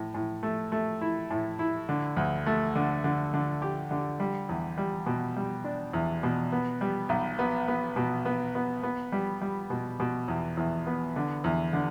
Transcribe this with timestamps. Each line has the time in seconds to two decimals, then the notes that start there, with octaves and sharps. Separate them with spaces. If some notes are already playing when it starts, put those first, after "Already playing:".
Already playing: A2
0.14 A2
0.43 A3
0.72 A3
1.01 E4
1.30 A2
1.59 E4
1.89 D3
2.17 D2
2.46 A3
2.75 D3
3.04 D3
3.34 D3
3.62 G4
3.91 D3
4.20 G3
4.49 E2
4.78 G3
5.06 B2
5.36 G3
5.64 D4
5.93 E2
6.23 B2
6.52 B3
6.81 G3
7.09 B1
7.39 B3
7.68 B3
7.96 B2
8.25 B3
8.55 B3
8.83 B3
9.12 G3
9.42 G3
9.70 B2
10.00 B2
10.28 E2
10.57 E2
10.87 B3
11.16 D3
11.44 E2
11.73 D3